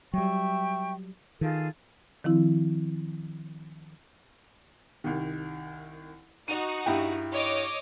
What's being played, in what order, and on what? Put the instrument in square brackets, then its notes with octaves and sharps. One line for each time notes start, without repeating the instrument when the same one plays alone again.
[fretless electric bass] F#3 G3 [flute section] E5 G5 C#6
[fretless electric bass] D#3 [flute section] F4 G#4 A4
[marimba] D#3 F3 C4 E4
[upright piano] C2 D#3
[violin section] D#4 F#4 [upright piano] D#7 F7
[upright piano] G2 E4 G5
[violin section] C#5 D#5 D6